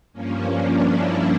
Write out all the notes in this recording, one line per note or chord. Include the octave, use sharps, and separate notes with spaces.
G2 F3 A#3 C#4
D4
E4